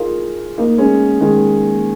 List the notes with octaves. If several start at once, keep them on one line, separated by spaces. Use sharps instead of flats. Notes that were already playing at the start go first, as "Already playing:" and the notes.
Already playing: D#4 F4 G#4 A#4
A#3 D#4
G#3 C#4
D#3 G#3